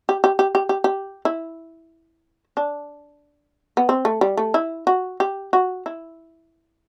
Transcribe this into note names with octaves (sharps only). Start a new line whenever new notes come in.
G4
G4
G4
G4
G4
G4
E4
D4
B3
C4
A3
G3
A3
E4
F#4
G4
F#4
E4